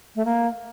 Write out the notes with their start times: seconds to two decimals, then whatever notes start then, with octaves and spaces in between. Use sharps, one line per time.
0.15 A3
0.25 A#3